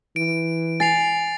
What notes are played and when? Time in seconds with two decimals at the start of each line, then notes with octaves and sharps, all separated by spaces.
0.16 E3 D7
0.80 G#5 A6 C7 F7